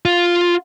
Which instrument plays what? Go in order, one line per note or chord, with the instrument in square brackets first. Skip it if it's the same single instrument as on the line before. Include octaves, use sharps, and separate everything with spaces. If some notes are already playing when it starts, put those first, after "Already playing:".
[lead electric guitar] F4